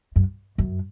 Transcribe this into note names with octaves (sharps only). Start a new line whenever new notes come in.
F#2
F#2